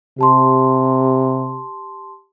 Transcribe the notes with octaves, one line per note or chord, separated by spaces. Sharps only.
C3 G4 A5 C6